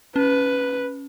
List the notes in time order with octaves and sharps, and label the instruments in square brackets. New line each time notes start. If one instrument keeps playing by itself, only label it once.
[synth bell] C#4 [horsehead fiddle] B4